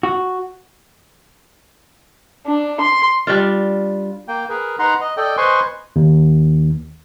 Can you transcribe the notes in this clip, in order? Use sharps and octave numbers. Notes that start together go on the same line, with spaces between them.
F#4
D4
C6
G3 D4 F4
A#3 G5
G#4 A#4 B4
D#4 B4 F#5 A#5 C6
D#5
A4 D5 D#5 G5
B4 C5 D#5 G#5 C6 C#6
D#2